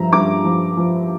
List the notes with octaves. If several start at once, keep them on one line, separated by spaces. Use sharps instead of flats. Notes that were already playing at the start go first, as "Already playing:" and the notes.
Already playing: G2 F3 E5 A#5
G2 A#5 D6
F3
F3